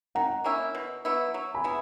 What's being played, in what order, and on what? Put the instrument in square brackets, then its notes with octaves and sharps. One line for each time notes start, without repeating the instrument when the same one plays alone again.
[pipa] D#3 [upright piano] F#5 A#5
[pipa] A#3 C#4 E4
B2
F#3 B3 E4
F#3
[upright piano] G#5 B5
[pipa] B3 E4 G#4